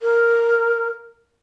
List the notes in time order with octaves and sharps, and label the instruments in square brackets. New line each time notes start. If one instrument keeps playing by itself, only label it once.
[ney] A#4